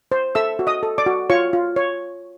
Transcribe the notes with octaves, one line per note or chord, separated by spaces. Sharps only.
C5
A4 E5 E6
F#4
D#5 D#6
A4
D5 D6
F#4
F4 C#5 C#6
F4
C#5